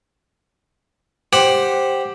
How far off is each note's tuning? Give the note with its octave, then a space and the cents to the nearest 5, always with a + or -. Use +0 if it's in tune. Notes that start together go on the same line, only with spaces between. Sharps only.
G4 +0 C5 +10 F#5 +0